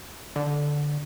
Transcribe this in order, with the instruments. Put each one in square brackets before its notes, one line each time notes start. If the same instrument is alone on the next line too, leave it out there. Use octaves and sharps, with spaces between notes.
[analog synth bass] D3